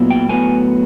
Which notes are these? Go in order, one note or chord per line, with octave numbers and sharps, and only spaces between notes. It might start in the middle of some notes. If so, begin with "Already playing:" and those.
Already playing: A#2 F#3 B3 E4
G5
A2 F#3 B3 G#5